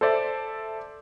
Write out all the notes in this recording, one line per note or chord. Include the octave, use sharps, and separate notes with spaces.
A4 C5 D5 E5